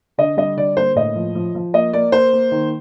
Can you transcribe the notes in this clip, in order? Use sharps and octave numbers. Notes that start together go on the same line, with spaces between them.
D3 D#5
G3 D#5
D3 D5
A#3 C5
A2 D#5
F3
F3
F3
A#3 D#5
A#3 D5
A#3 C5
A#3
D#3